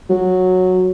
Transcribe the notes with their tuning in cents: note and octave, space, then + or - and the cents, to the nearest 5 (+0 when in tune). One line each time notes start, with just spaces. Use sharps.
F#3 -10